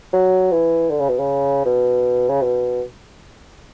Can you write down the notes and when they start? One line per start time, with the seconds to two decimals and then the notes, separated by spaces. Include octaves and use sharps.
0.13 F#3
0.52 E3
0.90 D3
1.00 C#3
1.09 B2
1.19 C#3
1.66 B2
2.29 C#3
2.42 B2